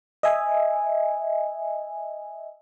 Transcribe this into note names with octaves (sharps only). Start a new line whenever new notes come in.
D#5 E5 G#5